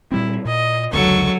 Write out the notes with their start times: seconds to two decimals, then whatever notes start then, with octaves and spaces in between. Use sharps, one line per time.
0.12 A#2 G3 C4 E4
0.45 A#2 D#5
0.93 F1 C#2 D3 F#3 A4 C#6